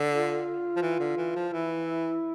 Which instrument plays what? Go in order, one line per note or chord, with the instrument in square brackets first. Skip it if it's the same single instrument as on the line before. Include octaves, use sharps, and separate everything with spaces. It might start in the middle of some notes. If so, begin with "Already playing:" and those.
Already playing: [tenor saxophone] D3
[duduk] F4
[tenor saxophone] F3
E3
D3
E3
F3
[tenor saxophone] E3 [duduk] E4